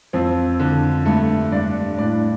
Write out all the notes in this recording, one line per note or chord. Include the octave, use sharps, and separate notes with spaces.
F2 C4
D3
G2 A3 A4
G2 D4 D5
A2 D4 D5